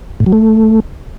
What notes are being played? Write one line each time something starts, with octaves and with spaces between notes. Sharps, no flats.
A2
F#3
A3